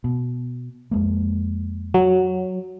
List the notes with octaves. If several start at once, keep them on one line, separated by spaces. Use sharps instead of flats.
B2
F2 G#3 A#3
F#3